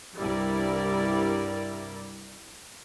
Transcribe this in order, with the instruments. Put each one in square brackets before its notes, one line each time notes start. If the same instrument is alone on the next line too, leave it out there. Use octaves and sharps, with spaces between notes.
[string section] C2 G2 G3 E4 A#4 D5